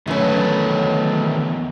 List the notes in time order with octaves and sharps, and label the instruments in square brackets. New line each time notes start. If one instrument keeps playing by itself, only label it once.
[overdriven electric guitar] E2 D3 [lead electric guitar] D#3 B4 [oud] F#3 C#4 [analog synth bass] A3